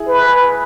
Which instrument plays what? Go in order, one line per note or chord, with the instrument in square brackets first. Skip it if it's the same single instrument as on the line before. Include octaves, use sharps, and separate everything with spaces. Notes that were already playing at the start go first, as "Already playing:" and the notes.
Already playing: [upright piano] E4 G#4
[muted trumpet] B4